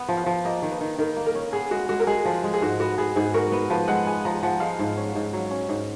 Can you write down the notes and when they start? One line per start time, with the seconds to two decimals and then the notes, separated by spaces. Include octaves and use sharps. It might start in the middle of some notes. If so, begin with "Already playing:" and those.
Already playing: B3 F#5
0.08 F3
0.17 F5
0.26 F3
0.45 A#3 D#5
0.62 D#3
0.71 B4
0.81 D#3
0.98 D#3 A#4
1.16 A#3
1.27 A#4
1.35 C#4
1.53 B3 G#4
1.71 G#3 F#4
1.89 G#3 F#4
2.00 A#4
2.07 G#3 G#4
2.25 F3
2.44 G#3
2.54 G#4
2.62 G#2 F#4
2.80 B3 F#4
2.98 B3 G#4
3.16 G#2 G#4
3.34 F#4 A#4
3.52 B3 B4
3.70 F3 B4
3.88 G#3 F#5
4.06 B3 G#5
4.25 F3 A#5
4.43 F3 F#5
4.60 G#3 F5
4.79 G#2
4.97 C#4
5.15 G#2
5.33 F#3
5.51 C#4
5.69 G#2